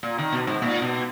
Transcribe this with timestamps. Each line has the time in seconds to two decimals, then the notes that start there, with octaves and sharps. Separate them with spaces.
0.03 A#2
0.18 D#3
0.32 B2
0.47 G#2
0.62 A#2
0.82 B2